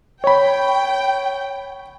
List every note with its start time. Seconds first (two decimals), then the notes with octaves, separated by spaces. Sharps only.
0.24 C#5 G5 B5